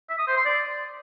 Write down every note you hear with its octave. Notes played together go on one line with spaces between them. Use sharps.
E5
D#6
C5
C6
D5